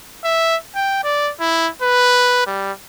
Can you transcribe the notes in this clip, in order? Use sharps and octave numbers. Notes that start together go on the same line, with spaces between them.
E5
G5
D5
E4
B4
G3